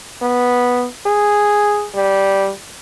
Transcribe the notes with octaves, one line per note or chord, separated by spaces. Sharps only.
B3
G#4
G3